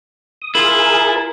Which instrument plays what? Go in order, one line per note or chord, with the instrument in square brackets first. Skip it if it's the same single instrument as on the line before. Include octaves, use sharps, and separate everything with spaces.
[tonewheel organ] D#6
[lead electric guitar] E4 F4 [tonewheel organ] G#4 A#4